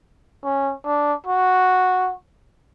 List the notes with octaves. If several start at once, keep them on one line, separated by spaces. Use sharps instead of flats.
C#4
D4
F#4